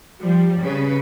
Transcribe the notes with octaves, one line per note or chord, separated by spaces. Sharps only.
F3 G3
C#3 B4